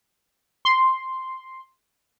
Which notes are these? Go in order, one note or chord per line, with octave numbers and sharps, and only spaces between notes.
C6